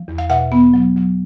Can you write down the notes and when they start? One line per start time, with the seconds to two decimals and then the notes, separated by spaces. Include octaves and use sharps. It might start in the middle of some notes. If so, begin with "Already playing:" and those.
Already playing: F3
0.08 E2
0.18 F5
0.30 B2 E5 F#5
0.52 B3
0.74 F#3
0.96 F#3